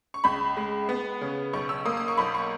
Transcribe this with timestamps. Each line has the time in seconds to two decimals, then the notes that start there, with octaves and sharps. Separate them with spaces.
0.14 C#6
0.24 C#2 B5
0.57 G#3
0.89 B3
1.21 C#3
1.53 B1 C#6
1.69 E6
1.85 A#3 D#6
1.97 D#6
2.08 C#6
2.17 B1 B5
2.35 C#6